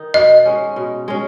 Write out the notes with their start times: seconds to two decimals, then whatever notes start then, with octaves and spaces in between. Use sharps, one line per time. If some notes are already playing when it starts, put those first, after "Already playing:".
Already playing: D#3 D#4
0.14 B2 D#5
0.45 G#3 C#4
0.76 B2
1.08 G#3 C#4